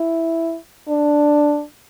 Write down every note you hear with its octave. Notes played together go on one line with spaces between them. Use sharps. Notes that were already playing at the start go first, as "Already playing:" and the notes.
Already playing: E4
D4